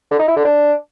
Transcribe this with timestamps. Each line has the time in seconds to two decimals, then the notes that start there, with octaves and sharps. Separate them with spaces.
0.11 D3
0.19 D#4
0.28 E4
0.36 D3
0.45 D4